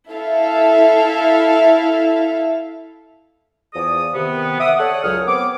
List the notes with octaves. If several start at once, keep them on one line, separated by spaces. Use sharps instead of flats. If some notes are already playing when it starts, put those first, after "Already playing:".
E4 A4 E5 F5
E2 F3 G#4 D5 D#6
C3 D#3 B3
E5 F#5 D6 D#6
A4 C#5 D5 F#5
C#2 F#2 F#3 C#5 D#6 F6
B3 C4 C#5 D6